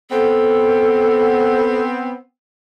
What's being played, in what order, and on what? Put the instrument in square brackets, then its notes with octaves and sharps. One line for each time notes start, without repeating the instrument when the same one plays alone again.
[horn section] B3 C4 [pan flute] A4